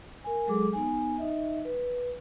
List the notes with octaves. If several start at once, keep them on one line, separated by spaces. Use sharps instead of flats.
A#4 G#5
F#3 G#3 G#4 A4 D6
B3 D#4 G#5
D#4 D#5 E5
B4